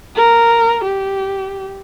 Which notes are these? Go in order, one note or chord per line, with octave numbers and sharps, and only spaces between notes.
A#4
G4